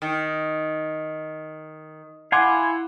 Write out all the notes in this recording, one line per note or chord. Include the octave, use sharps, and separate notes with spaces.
D#3
E4 F5 F#5 G#5 C6 D6